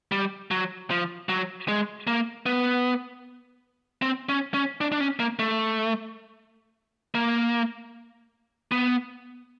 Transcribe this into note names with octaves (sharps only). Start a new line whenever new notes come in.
G3
F#3
F3
F#3
G#3
A#3
B3
C4
C#4
C#4
D4
D4
C#4
A#3
A3
A#3
B3